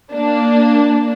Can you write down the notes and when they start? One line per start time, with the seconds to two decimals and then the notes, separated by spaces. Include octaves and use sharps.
0.12 A#3 D4